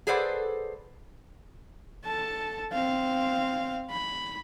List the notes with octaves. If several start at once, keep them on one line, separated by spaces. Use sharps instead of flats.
G#4 A4 B4 C5 D5 F#5
A4 A5
C4 F5
B5